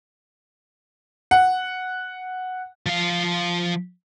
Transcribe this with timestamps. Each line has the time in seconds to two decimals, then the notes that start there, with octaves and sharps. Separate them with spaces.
1.31 F#5
2.86 F3 F5